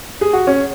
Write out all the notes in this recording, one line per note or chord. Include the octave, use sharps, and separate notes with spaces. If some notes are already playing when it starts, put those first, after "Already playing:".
G#4
F#4
C#4